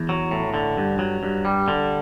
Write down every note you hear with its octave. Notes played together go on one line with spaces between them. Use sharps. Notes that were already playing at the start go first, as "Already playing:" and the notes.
Already playing: E2
F#3
A2
D3
G2
F#3
G2
G3
D3